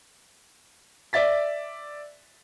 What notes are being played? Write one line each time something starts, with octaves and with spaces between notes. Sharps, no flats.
D5 E5 A6 B6